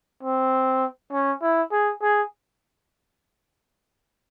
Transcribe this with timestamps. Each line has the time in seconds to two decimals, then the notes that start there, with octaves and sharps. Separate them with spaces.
0.23 C4
1.12 C#4
1.41 E4
1.72 G#4
2.01 G#4